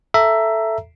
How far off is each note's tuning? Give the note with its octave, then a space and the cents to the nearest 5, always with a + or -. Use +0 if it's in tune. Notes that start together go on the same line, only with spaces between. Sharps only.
A4 +0 E5 +10 A#5 +0